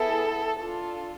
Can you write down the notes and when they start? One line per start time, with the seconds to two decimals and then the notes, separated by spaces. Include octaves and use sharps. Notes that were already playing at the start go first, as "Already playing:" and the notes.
Already playing: B3 E4 G#4 A4
0.56 D4 F4 A4